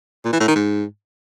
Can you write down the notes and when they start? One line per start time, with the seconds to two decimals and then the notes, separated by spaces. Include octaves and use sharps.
0.25 A#2
0.32 E3
0.40 A2
0.48 D#3
0.55 G#2